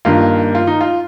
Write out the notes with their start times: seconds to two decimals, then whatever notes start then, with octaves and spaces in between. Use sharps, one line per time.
0.05 G2 D#3 A#3 F4
0.55 F4
0.67 D#4
0.81 F4